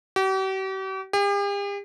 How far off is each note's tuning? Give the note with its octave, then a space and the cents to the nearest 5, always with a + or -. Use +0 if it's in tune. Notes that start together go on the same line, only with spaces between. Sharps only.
G4 -45
G4 +45